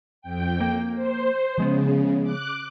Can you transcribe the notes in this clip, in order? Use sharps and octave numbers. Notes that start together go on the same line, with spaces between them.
F2 G5
A#3
C5
C#3 F3 G#3 B3
D6 F#6